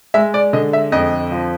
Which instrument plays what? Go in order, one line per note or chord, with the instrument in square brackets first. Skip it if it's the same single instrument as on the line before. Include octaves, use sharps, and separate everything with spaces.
[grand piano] G#3 E5
D5
D3 D#5
E5
F2 D#5
F3